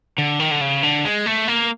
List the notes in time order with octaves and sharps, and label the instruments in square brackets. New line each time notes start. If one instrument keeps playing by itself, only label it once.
[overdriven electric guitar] D3
D#3
D3
C#3
D3
G#3
A3
A#3